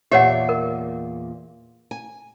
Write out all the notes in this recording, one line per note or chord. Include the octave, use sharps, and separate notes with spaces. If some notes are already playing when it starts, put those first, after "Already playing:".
E2 A#2 G4 C#5 E5 F#5
A#4
G#5